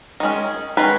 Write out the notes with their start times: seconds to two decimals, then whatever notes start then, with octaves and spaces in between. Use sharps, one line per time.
0.20 D#3 G#3 C#4
0.77 D#3 G#3 C#4 B4